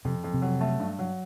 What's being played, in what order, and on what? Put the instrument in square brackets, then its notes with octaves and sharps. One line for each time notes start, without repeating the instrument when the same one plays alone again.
[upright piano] F2 [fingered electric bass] C3
[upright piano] F2
[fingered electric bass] C3
[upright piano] F#3
A3
G2
F#3